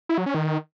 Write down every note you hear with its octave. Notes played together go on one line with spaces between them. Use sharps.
E4
F#3
C#4
D#3